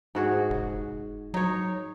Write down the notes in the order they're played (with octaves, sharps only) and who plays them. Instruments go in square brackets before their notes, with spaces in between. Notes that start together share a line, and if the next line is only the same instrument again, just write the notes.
[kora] G#2 F#4 G#4
[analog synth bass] F1
[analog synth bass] F#3 [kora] D#4 C#5